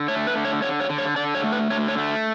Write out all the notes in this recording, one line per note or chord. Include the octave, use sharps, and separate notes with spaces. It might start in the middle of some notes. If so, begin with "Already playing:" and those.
Already playing: D3
A3 C#5
B4
D3
C#5
D3 C#5
C#5
D3
C#5
D3 D5
C#5
A3
B4
D3 C#5
C#5
A3